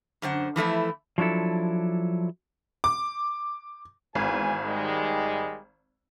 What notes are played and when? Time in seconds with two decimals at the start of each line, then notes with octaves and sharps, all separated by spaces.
0.22 F#2 D3 C5 F#5
0.56 E3 F3 A3 E4
1.18 F3 F#3 D4 E4 A4
2.84 D6
4.15 G#1 E2 G#5
4.62 D#3 G3 G#3